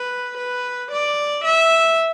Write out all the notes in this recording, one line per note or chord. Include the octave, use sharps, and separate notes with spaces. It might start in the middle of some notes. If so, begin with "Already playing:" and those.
Already playing: B4
B4
D5
E5